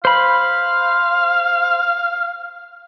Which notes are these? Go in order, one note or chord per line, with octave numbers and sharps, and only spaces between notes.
C5 F5 B5